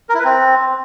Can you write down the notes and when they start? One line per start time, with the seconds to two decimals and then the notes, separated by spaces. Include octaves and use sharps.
0.09 A#4
0.14 E4
0.19 B4
0.24 C4